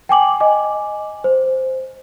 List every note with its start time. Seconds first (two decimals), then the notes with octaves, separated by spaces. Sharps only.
0.09 G5 G#5 D6 F#7
0.40 D#5 G#5 D6
1.24 C5